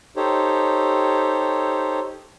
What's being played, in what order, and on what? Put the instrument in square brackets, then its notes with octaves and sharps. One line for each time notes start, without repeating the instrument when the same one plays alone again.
[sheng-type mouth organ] D#4 G4 A4 C5 C#5